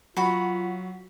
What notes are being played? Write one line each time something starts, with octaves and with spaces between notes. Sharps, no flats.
F#3 F4 F#4 B5